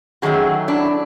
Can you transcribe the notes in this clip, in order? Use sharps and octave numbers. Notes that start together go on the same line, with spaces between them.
F#2 D#3 F#3 A3 F#4 G#4
D4 E4